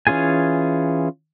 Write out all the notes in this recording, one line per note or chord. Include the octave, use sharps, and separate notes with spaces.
E3 C#4 F4 G#4 G#5